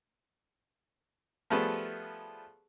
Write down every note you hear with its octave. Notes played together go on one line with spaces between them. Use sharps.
F3 G3 A3 B3 G#4 B4